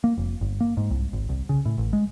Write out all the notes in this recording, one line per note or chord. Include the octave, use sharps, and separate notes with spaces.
A#3
F1
G1
A#3
G#2
C2
G#1
C2
C#3
A2
A1
G#3